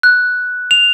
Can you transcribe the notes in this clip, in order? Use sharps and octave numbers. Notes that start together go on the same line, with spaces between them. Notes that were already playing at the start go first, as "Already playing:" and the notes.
F#6
F7